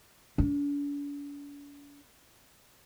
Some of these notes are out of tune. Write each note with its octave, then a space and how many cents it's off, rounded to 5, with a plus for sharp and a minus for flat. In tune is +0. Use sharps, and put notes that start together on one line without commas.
D4 -45